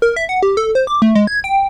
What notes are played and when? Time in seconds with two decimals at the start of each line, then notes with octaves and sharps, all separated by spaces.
0.02 A#4
0.16 E5
0.29 F#5
0.42 G4
0.57 A4
0.75 C5
0.87 D6
1.02 A3
1.15 G#3
1.27 G#6
1.44 G5